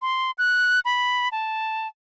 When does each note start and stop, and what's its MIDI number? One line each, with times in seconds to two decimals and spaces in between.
0.02 0.31 84
0.38 0.80 90
0.85 1.29 83
1.32 1.88 81